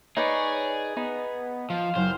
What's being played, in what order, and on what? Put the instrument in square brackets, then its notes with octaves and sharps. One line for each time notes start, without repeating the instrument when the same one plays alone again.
[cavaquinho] D#4 B4 D5 [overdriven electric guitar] G#4 [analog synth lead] C#5
[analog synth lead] B3 [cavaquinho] D#4
[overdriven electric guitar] F3 [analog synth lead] F5
[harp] F#1 F#3 [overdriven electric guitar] C5